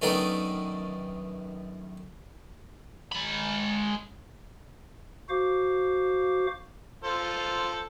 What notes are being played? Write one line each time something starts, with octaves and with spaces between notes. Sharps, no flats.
F#2 D#3 A3 B3 D4 D#4
G#3 B5
F#4 C5 F5 D6
F4 A4 C5